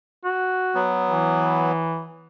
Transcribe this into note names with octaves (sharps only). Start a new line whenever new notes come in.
F#4
F#3 B3
E3